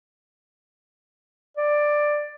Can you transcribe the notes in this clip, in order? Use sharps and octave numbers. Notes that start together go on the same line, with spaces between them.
D5